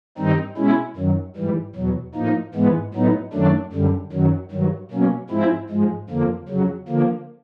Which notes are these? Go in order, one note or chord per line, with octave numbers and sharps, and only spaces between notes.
G2 D#3 G3 C4 D#4
B2 G#3 C#4 E4
F#2 D#3 F#3
G#2 E3 G3
E2 B2 F#3
A2 F3 A#3 D#4
G#2 E3 G#3 B3
A2 F#3 B3 D#4
F#2 D#3 F#3 A3 D4
F#2 D3 G3
F#2 D#3 F#3
G2 D#3 F#3
B2 F#3 A#3 C#4
G#2 F3 G#3 C4 E4
G#2 F3 G#3
F2 D3 F3 A#3
F2 C#3 F#3
D3 F3 A#3